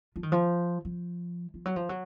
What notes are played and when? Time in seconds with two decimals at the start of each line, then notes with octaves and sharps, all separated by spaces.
0.16 F3
0.23 D#3
0.32 F3
0.85 F3
1.54 F3
1.65 F#3
1.76 F3
1.89 F#3